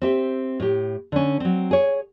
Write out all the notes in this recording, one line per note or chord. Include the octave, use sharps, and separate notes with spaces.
C4 G4 E5
A2 G4
D3 C#4
F#3 C4
G#4 C#5